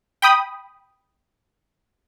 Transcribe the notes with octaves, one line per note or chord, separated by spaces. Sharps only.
G5 B5 D#6